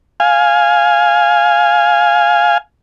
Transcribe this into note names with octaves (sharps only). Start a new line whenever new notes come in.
F5 G#5